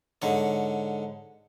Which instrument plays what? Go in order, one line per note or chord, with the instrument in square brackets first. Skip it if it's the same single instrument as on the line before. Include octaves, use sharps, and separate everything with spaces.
[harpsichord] G#2 D3 C#5